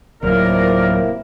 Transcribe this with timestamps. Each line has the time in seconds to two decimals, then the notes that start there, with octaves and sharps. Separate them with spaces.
0.22 D1 C3 F3 F#3 A#3 E4 A#4 D5